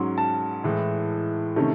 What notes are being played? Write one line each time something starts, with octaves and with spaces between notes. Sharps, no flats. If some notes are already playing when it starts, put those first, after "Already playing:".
Already playing: G#2 F#3 C#4 C6
A5
A2 E3 G#3
C3 D#3 A3 C#4